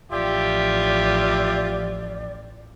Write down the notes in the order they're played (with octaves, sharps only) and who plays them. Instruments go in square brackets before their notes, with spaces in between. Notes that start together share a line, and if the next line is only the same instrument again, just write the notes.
[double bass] A1 F3 [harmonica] F4 E5 [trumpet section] G4 [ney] D5